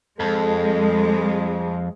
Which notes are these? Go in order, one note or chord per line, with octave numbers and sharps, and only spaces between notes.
F2 G#3 A4